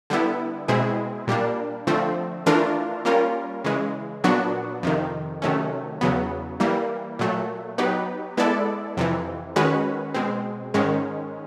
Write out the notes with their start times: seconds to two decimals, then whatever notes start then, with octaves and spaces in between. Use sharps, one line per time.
0.10 D3 G3 B3 E4
0.68 B2 G#3 C4 E4 G#4
1.27 A#2 G3 A#3 D4
1.87 D3 F3 A3 C4
2.46 E3 A3 D4 F4 A#4
3.05 G3 A#3 C#4 F4 A#4
3.64 C#3 E3 G#3
4.24 A#2 F#3 B3 D4 F#4
4.83 F2 C3 D#3
5.42 C3 D#3 F#3 A3 C#4
6.01 E2 C#3 F#3 B3
6.60 E3 G3 A#3
7.19 A#2 F#3 A3
7.78 F#3 B3 D#4 G4 B4
8.37 G#3 B3 E4 A4 D5
8.97 F2 C3 E3
9.56 D#3 G#3 C#4 F#4 B4
10.14 B2 G#3 C4
10.74 G#2 D#3 G#3 C#4